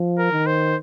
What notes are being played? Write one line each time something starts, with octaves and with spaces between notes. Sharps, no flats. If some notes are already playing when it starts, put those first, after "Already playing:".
Already playing: F3
A#4
D#3
C5